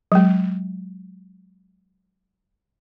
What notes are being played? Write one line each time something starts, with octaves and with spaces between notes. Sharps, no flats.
F#3 G#3